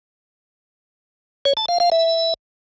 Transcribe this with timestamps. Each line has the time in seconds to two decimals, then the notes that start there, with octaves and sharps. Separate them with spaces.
1.45 C#5
1.57 A5
1.69 F5
1.80 F5
1.92 E5